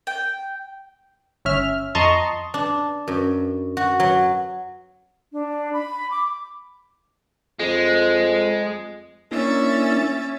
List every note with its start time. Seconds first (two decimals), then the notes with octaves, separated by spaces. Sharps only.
0.07 G5
1.45 G1 C#4 E5 F6
1.95 F2 D#5 A5 A#5 C6 C#6
2.54 D4
3.08 F#2
3.77 F#4
4.00 F#3
5.32 D4
5.73 B5
6.11 D6
7.60 F2 G#3
9.31 A#3 C#4 D4 E4 E5 A6